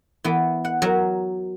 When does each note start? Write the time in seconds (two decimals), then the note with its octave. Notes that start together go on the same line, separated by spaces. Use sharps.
0.24 E3 B3
0.65 F#5
0.82 F#3 A#4